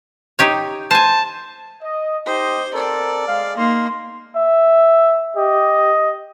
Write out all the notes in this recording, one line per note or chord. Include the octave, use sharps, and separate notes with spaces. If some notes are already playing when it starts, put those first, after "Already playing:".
D#4 G4 C#5
C5 G#5 A5
D#5
D#4 G4 C5 D#5
C4 A4 A#4 D5
G#3 F5
A#3 D#4 C6
E5
G4 D#5